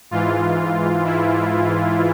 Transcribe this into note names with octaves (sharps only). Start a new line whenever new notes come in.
G#2 E3 F4
E4